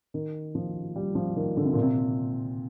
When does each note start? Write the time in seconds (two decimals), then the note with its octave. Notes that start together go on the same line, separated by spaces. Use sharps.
0.14 D#3
0.55 F3
0.96 G3
1.15 F3
1.36 D#3
1.57 D3
1.64 C3
1.73 A#2
1.82 C3